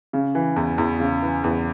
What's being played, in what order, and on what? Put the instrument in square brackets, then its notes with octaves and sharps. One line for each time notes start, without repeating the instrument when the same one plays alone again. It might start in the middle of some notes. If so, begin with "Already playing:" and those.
[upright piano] C#3
E3
E2
E2
C#3
E3
E2